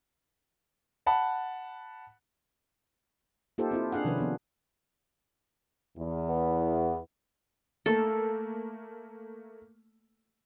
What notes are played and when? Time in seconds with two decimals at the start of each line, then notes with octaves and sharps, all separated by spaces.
1.06 F#5 A5 B5
3.58 A#3 D#4 F4 G4 A4 C5
3.71 C4 E4 F4
3.92 D4 G#4 F5 F#5
4.05 C3 D#3 F3 C#4 D4 B4
4.18 F3 B3 D4
5.97 E2
6.29 B3
7.86 A3 A#3 A4